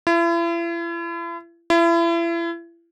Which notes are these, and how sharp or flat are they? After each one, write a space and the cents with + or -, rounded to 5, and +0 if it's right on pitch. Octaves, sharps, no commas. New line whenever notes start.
E4 +40
E4 +35